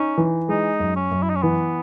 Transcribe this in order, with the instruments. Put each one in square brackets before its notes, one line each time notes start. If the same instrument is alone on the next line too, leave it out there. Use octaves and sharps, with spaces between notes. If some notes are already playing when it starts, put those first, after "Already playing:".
Already playing: [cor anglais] C#4 [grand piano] D#4
[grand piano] E3
[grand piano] G#3 [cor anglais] D#4
[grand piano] F#2
[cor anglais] C#4
[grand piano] F#2
[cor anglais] E4
D#4
C#4
[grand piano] E3 [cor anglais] B3